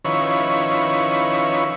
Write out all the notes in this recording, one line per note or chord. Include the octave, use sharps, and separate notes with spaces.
D#3 F3 C#4 E4 B4 C#5